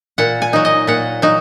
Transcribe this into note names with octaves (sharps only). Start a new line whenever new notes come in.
A#2 F#5
G#5
F#3 D#4
D#5
A#2 F#5
F#3 D#4